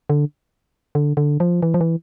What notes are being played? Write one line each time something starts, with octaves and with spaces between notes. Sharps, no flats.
D3
D3
D3
F3
E3
F3
E3